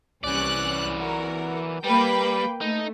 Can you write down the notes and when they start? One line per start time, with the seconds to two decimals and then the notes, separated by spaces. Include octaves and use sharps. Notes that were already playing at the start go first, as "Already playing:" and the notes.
0.24 C2 E3 C#4 D5 F#6
0.98 F#4 A#4
1.84 G3 A#3 B4 G5
2.61 A3 D#4